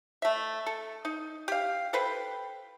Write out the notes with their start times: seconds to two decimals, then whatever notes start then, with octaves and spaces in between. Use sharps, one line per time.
0.22 A3 E5
0.66 A4
1.05 D#4
1.48 G4 F5
1.93 A4 B4 C5 G5